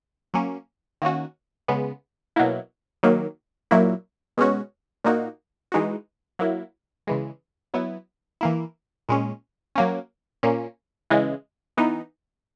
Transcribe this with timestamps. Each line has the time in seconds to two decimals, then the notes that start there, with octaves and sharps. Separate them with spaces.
0.34 F#3 A#3 C#4
1.02 D#3 A#3 C#4 F#4
1.68 C#3 G#3 B3
2.36 B2 F#3 A#3 E4
3.03 D#3 F#3 A#3
3.71 A#2 F#3 A#3 E4
4.38 B2 G#3 C#4 F#4
5.04 A#2 A#3 D#4 F#4
5.72 E3 G#3 D#4 F#4
6.39 F#3 A#3 E4
7.07 C#3 E3 G#3
7.74 F#3 B3 E4
8.41 E3 A#3 E4
9.09 A#2 G#3 C#4
9.76 F#3 A#3 C#4
10.43 A#2 A#3 C#4
11.10 C#3 E3 G#3
11.77 E3 B3 D#4